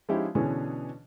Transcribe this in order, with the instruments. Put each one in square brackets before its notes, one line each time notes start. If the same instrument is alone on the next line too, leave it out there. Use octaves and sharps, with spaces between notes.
[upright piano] F3 G#3 C#4 D#4 E4 G4
B2 D3 E3 C#4 G#4